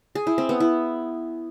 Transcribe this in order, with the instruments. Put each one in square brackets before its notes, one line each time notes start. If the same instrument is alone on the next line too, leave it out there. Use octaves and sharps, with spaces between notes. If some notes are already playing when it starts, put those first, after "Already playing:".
[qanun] G#4
E4
C4
B3
E4